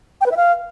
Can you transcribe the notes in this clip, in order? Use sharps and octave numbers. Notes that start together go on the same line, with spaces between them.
G5
B4
E5
F5